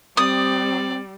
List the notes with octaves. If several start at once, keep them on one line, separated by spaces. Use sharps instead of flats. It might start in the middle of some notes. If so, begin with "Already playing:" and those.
G3 C4 D5 D#6